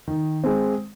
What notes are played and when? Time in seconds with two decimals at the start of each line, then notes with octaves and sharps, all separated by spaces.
0.08 D#3
0.44 G#3 C4